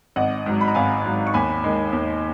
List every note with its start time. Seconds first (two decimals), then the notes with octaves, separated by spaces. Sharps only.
0.16 G#1 D#5 F#5
0.46 G#2 F#3
0.61 B5
0.68 A#5
0.75 G#1 F5 G#5
1.05 G#2 F#3
1.27 C#6
1.34 D#2 G#5 B5
1.64 D#3 G#3
1.93 D#2